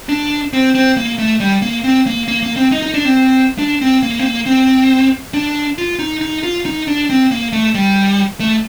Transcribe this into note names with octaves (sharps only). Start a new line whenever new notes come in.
D4
C4
C4
A#3
A3
G3
A#3
C4
A#3
A#3
A#3
C4
D#4
D#4
D4
C4
D4
C4
A#3
C4
A#3
C4
D4
F4
D#4
D#4
F4
D#4
D4
C4
A#3
A3
G3
A3